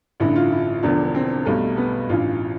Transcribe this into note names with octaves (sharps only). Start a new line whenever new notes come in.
A1 G2 D3 E4
F4
E4
E1 E2 D3 F3 D4
C4
B1 B2 G3 A3
B3
A1 G2 E3 F4